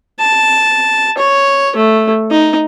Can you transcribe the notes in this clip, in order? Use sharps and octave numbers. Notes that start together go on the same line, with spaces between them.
A5
C#5
A3
D#4